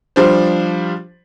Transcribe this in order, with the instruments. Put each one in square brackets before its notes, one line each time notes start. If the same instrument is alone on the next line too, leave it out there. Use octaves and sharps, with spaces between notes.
[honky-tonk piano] F3 G3 D4 C5